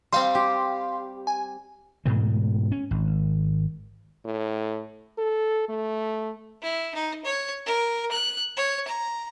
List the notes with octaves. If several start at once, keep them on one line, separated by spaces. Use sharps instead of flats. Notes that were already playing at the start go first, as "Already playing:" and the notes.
G3 C4 F5 G5 C6
G4
G#5
G#2 B2 E3 A3
C#4
G#1
A2
A4
A3
E4
D#4
C#5
A#4
F#6
C#5
A#5